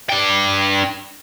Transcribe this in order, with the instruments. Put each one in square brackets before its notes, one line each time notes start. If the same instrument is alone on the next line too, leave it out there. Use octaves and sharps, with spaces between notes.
[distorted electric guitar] D4 G5